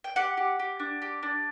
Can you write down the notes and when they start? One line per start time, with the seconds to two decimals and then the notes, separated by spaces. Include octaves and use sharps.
0.04 G5
0.16 G4 F#5
0.37 G4
0.59 G4
0.80 D4
1.02 G4
1.23 D4